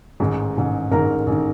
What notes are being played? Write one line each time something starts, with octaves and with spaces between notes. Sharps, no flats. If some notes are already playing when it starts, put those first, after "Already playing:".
A1 G#2 D#3
A1 G#2 D#3
A1 G#2 D#3 A#4 A#5
A1 D#3